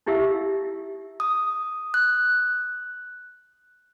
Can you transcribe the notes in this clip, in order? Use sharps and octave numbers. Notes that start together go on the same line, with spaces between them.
D#4 E4 G4 E5 F5 E6
D#6
F#6